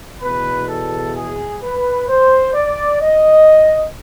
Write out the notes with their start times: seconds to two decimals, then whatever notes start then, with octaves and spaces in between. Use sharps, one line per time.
0.21 E2 B2 B4
0.68 A4
1.15 G#4
1.61 B4
2.08 C5
2.54 D5
3.01 D#5